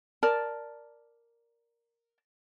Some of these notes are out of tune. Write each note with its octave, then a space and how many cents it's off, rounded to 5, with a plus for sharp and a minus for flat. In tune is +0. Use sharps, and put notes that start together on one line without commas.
A#4 +0 D5 +0 A5 +0